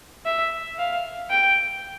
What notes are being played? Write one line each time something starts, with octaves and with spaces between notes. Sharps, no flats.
E5
F5
G5